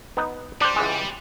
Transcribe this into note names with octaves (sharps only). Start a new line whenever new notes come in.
B3 D#4
G3 D4 C5
C#2 E3 G#3